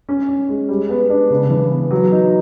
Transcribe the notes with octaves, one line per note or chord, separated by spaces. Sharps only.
C#4
C#4
G#3
G3
B3
D4
C#3
E3
B3
F#3
D#4